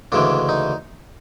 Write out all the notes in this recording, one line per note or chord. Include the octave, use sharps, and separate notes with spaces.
D2 C#3 E3 G#3 D4
D#4